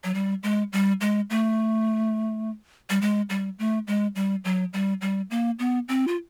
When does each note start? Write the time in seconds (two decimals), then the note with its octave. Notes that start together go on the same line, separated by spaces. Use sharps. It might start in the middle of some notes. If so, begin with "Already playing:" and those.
0.04 F#3
0.14 G3
0.43 G#3
0.73 G3
1.01 G#3
1.30 A3
2.90 G3
3.01 G#3
3.30 G3
3.59 A3
3.87 G#3
4.15 G3
4.45 F#3
4.73 G3
5.01 G3
5.31 A#3
5.59 B3
5.88 C4
6.08 F4